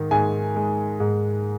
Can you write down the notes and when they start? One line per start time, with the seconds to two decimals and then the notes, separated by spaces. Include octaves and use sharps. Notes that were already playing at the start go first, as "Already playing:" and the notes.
Already playing: G#2 D#3
0.11 G#2 G#5
0.56 G#3
1.00 G#2